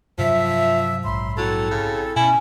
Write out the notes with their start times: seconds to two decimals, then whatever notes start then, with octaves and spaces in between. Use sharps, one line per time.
0.18 G2 C3 F3 F#3 E5
1.05 A#1 G#2 F#3 B5 C6
1.37 F#3 C4 E4 A4
1.71 C#3
2.16 B2 C#4 E4 G#5